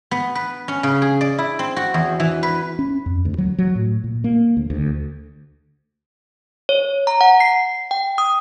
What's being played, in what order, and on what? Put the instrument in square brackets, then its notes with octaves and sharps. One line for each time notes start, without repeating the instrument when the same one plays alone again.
[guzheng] B3
B4
C#4
C#3
G#4
D5
E4
C4
F#4
E2
E3
B4
[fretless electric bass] C#4
F2
D2
F#3
F#3
A2
A#2
A#3
D2
D2
[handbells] C#5
A#5
F#5
C7
G5
D#6